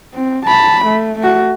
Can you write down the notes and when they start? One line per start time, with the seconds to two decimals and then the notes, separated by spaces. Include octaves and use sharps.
0.14 C4
0.46 A5 B5
0.85 A3
1.19 A3 F#4